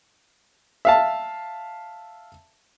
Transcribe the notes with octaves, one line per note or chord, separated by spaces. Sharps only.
E5 F5 A5